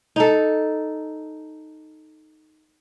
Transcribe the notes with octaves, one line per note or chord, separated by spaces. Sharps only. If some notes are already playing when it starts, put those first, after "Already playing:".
D#4 A4